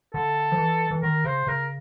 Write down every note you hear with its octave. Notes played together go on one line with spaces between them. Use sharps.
D3 A4
F3
E3
E3
D#3 A#4
C#3 C5
C#3 A#4